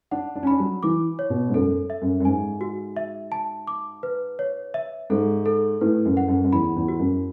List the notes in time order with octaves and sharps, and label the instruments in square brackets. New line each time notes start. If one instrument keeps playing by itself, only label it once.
[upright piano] D4 [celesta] F#5
[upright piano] D4
C#4
[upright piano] D4 [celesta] B5
[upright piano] F#3
[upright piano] E3 [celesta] D6
[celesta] C#5
[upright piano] B2
G#2
[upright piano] F#2 [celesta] A4
[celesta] E5
[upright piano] F#2
F#2
[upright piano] G#2 [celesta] G#5
[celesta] F#4
E5
A5
D6
B4
C#5
E5
[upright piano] G#2 [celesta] A4
[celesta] A4
[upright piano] A2 [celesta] B4
[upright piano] F#2
[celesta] F#5
[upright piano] F#2
F#2
[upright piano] E2 [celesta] B5
[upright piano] E2
[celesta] F#4
[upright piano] F#2